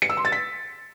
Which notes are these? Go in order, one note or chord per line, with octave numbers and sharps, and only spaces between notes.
C#7
E6
C6
A6
B6